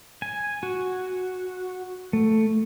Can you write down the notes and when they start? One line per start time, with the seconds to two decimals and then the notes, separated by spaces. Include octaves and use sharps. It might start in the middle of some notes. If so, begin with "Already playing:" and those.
0.22 G#5
0.63 F#4
2.13 A3